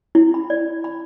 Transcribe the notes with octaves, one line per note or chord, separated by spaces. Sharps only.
E4
B5
D5
B5